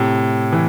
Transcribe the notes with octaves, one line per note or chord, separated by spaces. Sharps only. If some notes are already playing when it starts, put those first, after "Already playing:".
Already playing: A2 C3
E3